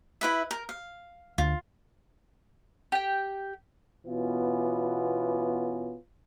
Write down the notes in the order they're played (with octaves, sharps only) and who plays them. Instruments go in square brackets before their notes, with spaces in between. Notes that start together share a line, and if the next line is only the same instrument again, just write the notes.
[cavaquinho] E4 B4 E5
A#4
F5
[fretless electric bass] D2 [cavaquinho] F4
[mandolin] G4 G5
[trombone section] B2 E3 B3 C#4 F4